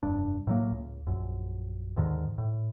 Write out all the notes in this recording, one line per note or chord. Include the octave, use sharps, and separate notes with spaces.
F1 G2 D4
A2 F#3 A#3
C#2
A#1 F#2
D#2 G#2 D3 D#3
A2